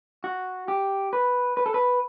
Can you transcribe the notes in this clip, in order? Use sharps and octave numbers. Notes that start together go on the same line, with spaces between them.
F#4
G4
B4
B4
A4
B4